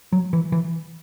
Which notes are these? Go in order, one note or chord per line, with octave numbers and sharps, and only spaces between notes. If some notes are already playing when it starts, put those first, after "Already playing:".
F#3
E3
E3